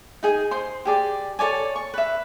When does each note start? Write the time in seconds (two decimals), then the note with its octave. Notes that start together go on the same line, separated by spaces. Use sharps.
0.23 D#4 G#4 G#5
0.51 C5 C6
0.85 G4 G#4 D5
1.39 A4 C#5 D5 G#5
1.76 C#6
1.94 B4 E5